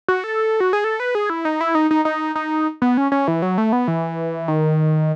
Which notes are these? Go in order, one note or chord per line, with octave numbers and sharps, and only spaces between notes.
F#4
A4
F#4
G#4
A4
B4
G#4
E4
D#4
E4
D#4
D#4
D#4
D#4
B3
C#4
C#4
E3
F#3
A3
B3
E3
D#3